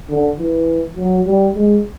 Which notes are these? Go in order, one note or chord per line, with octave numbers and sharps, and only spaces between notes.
D3
E3
F#3
G3
G#3